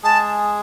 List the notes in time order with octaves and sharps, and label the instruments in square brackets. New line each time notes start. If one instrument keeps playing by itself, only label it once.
[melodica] G#3 G#4 [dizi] A5